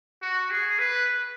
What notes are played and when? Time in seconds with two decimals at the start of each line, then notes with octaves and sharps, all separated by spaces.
0.22 F#4
0.51 G#4
0.79 B4